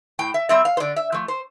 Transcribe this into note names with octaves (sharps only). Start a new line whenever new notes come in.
A2 G5
E5
G3 C4 E5
F5
C5
D3 D5
E5
F3 A3
C5